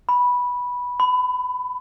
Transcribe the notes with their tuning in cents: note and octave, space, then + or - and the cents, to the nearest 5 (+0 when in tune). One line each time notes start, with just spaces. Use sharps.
B5 -10
B5 +25